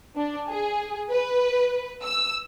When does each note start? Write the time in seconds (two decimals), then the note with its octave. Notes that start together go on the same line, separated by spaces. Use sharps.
0.16 D4
0.49 G#4
1.11 B4
2.03 E6